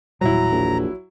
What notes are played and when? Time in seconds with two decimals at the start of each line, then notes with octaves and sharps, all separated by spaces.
0.21 E1 A#2 F#3 G3 E4 A#5
0.51 A#1